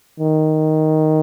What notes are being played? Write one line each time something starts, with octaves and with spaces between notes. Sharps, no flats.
D#3